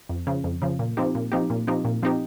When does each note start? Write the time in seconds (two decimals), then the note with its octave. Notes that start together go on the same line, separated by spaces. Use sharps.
0.09 F2
0.27 C#3 F3
0.44 F2
0.62 C#3 F3
0.79 A#2
0.97 F3 C4 D#4 G4
1.15 A#2
1.32 F3 C4 D#4 G4
1.50 A#2
1.67 F3 C4 D#4 G4
1.85 A#2
2.03 F3 C4 D#4 G4